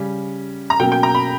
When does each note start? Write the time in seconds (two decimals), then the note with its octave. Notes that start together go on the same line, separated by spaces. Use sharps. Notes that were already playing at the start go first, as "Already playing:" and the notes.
Already playing: C#3 G3 C#4
0.70 A#5
0.80 B2 F#3 A#3 C#4 G5
0.92 G5
1.03 A#5
1.15 B5